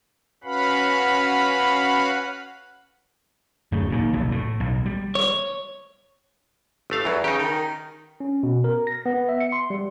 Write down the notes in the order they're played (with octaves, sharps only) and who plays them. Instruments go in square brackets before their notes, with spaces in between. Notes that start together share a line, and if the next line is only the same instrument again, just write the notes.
[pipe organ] C#4 F#4 B4 F5 F#5 B5
[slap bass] D1 F#2 A3
D#2 A#2 D#3
F1 B1
A2
B1
G3
[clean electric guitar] C#5
[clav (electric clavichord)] G1 A3 F5
[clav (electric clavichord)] E2 F#3 [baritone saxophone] E3
[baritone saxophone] C#3 [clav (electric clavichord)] D#4 G4
[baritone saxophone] D#3
[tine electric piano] C#4
B2
A#4
A#6
B3
E5
C#7
C6
G3